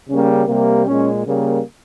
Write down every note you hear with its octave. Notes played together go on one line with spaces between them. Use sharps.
C#3 G3 A#3 C#4
C3 G3 A#3
A#2 G#3 C#4
C#3 G3 A#3